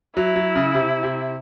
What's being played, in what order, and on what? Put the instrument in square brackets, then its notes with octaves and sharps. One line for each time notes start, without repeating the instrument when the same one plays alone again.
[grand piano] F#3 [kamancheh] E4
[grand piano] F#3
C#3
C3
C3